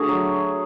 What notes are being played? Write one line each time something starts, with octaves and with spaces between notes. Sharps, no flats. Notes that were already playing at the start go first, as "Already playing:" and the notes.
Already playing: D3 A3 F#4 G#4
F#3